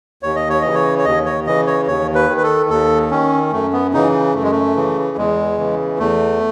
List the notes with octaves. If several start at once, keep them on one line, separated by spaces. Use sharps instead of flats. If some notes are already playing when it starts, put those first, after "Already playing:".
D#2 C#5
D#5
C#5
C#3 E3 D#5
C#5
C#5
D#2 D#5
C#5
C#3 E3 D#5
C#5
D#2 C#5
B4
D#3
B4
A4
D#2 A4
D#3 C#4
F#2 A3
B3
C#3 E3 D#4
F#2 A3
G#3
A3
C#3 E3
E2 G#3
C#3 E3
E2 A3